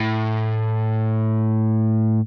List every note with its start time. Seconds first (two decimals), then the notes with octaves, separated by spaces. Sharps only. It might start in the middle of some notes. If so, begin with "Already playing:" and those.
Already playing: A2